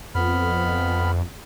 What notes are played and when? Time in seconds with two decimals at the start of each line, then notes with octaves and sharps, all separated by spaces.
0.15 F2 B3 B5 F6